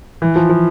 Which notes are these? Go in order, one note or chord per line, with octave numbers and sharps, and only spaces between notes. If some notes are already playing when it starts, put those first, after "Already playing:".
E3
F3
F3